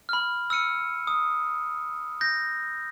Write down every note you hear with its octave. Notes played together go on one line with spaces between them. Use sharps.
B5 F6
E6 F6 C#7 D#7
D#6
G6 A#6